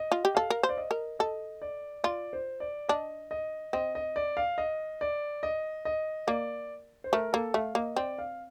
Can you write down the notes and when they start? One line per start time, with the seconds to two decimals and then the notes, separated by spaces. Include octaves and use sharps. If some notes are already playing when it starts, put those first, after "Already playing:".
Already playing: D#5
0.12 F4
0.25 G4
0.35 A4 F5
0.50 A#4
0.63 C5
0.69 D5
0.77 D#5
0.91 A#4
1.19 A4 D#5
1.62 D5
2.04 F4 D5
2.33 C5
2.60 D5
2.89 D4 D#5
3.31 D#5
3.73 C4 D#5
3.95 D#5
4.16 D5
4.37 F5
4.58 D#5
5.01 D5
5.43 D#5
5.85 D#5
6.27 A#3 D5
7.04 C5
7.13 A3 A#4
7.33 A#3 A4
7.54 A3 F5
7.75 A#3 D#5
7.96 C4 D5
8.18 F5